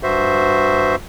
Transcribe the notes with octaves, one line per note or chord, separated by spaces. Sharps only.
G2 F#4 C5 E5